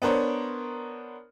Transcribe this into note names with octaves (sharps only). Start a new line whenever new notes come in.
B3 D4 A#4 C5 C#5